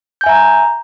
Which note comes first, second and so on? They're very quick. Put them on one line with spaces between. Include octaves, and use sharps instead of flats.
G6 G#5 E5 A#5